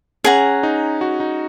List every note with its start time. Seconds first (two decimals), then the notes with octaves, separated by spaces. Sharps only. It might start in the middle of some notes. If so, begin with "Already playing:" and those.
0.24 C#4 G#4 F#5 A#5
0.63 D#4
1.01 F#4
1.20 D#4